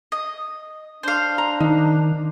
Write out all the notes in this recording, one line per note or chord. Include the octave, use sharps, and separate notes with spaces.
D#5
D4 C5 F5
A#5
D#3 D#4